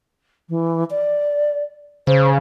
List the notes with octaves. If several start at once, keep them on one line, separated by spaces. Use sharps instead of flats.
E3
D5
C#3 C5